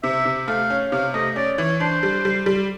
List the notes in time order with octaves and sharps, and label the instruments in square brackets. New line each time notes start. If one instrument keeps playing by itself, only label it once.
[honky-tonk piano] C3 [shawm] E5
[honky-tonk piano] C3
[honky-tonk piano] A3 [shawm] F5
[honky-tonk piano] C#4
[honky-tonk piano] C3 [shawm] F5
[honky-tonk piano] A3 [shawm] D#5
[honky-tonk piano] C#4 [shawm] D5
[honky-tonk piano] E3 [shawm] C#5
[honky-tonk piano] D4 [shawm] C5
[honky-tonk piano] G3
G3
G3